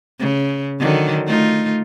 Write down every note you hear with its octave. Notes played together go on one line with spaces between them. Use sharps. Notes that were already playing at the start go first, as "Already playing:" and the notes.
C#3
D3 D#3 F#3
A3 D#4 F4